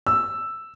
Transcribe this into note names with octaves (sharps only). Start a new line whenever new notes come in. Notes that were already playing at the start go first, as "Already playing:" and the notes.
E6